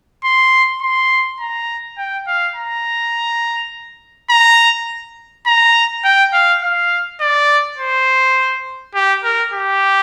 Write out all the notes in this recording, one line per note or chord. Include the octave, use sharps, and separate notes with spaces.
C6
C6
A#5
G5
F5
A#5
A#5
A#5
G5
F5
F5
D5
C5
G4
A#4
G4